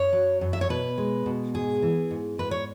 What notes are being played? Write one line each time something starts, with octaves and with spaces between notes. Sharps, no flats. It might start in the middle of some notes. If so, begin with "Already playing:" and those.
Already playing: F#2 C#5
F#3
F#2
E5
C#5
B2 B4
G#3
B2
G#2 G#4
E3
G#2
G#2 B4
C#5